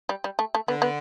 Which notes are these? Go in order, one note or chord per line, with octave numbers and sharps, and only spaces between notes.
G3
G3
A3
A3
D3 B3
B3